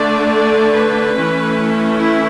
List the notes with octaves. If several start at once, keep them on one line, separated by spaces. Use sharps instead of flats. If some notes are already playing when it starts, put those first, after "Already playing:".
Already playing: D3 A3 D4 D5
D5
B4
E3 A3 C#4
E4